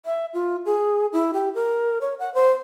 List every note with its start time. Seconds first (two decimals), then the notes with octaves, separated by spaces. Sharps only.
0.05 E5
0.34 F4
0.65 G#4
1.13 E4
1.34 G4
1.55 A#4
2.01 C#5
2.19 F#5
2.34 C5